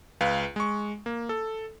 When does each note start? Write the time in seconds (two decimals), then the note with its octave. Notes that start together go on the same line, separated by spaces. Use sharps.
0.21 C#2 B4 F5
0.56 G#3 C#6
1.06 A#3
1.29 A4